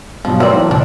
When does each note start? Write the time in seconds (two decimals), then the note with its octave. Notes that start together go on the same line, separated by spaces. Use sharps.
0.25 G2 B2 F3 F#3
0.40 A3 C4 A#4 C#5 D5 C6
0.52 E3 D#4
0.71 C#2 D4